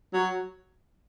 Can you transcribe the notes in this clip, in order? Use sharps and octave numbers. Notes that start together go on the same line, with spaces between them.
F#3